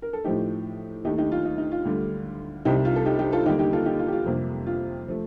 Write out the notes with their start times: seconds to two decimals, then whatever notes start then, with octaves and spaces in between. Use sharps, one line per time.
0.02 A#4
0.13 A4
0.24 A2 F3 A3 D#4 G4
1.05 D#2 D#3 A3 D#4 G4
1.18 D#4 G4
1.32 F4
1.45 D#4
1.58 D#4
1.71 F4
1.85 D2 D3 G3
2.65 C2 C3 G3 D#4 G4
2.85 F4
2.96 A4
3.05 D#4 G4
3.19 D#4 G4
3.32 F4 A4
3.45 D#2 D3 G3 A#3 D#4 G4
3.59 D#4 G4
3.73 F4 A4
3.86 D#4 G4
3.99 F4
4.08 G4
4.13 F4
4.26 F2 C3 G3 A#3
4.66 F4
5.08 F3 A3